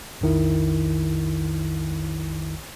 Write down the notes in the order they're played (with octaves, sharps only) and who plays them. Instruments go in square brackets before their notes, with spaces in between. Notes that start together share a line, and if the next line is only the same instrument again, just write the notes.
[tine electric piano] B1 F2 D#3 E4